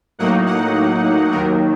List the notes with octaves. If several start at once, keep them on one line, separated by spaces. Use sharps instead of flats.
A2 F#3 A#3 D#4 F#5
F#5
D#2 D#3 F#3 A#4